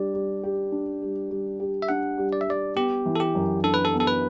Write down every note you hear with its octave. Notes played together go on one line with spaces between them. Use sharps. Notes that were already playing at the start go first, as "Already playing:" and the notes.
Already playing: G3 D4 G4 D5
G3
G4
D4
G3
G3
G4
E5
D4 F#5
G3
D5
E5
G3 D5
B3 G4
E3
A4
G4
F#2
D4 A4
B4
A4
B3
A4
B4